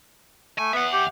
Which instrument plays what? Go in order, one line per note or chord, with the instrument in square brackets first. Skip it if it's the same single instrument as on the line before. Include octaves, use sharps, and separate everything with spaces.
[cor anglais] A3 [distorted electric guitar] G#5
[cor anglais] B3 [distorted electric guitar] E5 F#5
[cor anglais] G4